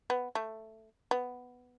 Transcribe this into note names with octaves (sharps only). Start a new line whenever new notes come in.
B3
A3
B3